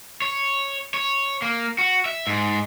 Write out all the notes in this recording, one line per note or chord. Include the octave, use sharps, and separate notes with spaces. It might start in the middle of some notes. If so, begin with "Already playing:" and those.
C#5
C#5
A#3
F#4
E5
G#2